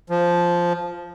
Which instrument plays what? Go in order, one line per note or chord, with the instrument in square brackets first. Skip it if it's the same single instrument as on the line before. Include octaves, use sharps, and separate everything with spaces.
[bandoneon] F3